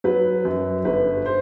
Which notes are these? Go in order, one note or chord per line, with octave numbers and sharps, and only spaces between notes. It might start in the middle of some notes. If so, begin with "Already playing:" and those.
F#3 B4
F#2
G1 B4
C5